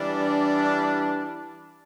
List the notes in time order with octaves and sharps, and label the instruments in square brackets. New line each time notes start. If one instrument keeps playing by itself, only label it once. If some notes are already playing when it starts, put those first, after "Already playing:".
Already playing: [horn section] E3 G3 D4